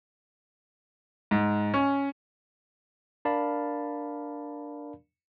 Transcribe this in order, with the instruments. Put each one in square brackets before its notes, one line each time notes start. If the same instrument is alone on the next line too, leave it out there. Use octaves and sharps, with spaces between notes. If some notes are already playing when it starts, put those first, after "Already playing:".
[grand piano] G#2
C#4
[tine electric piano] D4 A#4 D5 F5 A5 B5